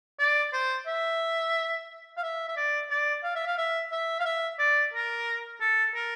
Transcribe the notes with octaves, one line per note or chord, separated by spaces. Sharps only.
D5
C5
E5
F5
E5
E5
D5
D5
F5
E5
F5
E5
E5
F5
E5
D5
A#4
A4
A#4